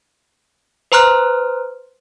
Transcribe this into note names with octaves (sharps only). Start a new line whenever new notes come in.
B4 C5 A#5 C6 F6 F#6